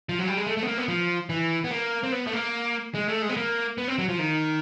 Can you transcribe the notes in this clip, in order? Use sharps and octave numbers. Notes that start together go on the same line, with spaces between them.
F3
F#3
G3
G#3
A3
A3
B3
A#3
B3
F3
E3
B3
A#3
C4
B3
A3
A#3
G#3
A3
G#3
B3
A#3
B3
C4
F#3
F3
D#3